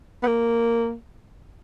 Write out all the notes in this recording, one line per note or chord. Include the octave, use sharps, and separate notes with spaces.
B3
A#3